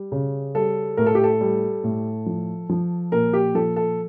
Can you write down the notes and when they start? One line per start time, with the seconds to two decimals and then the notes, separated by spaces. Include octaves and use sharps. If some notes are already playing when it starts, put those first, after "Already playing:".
Already playing: G3
0.12 C#3
0.55 G3 A4
0.97 A2 A#4
1.06 A4
1.15 G4
1.24 A4
1.41 G3
1.84 A2
2.26 F3
2.69 F3
3.12 A#2 A#4
3.33 G4
3.55 F3 A4
3.76 A4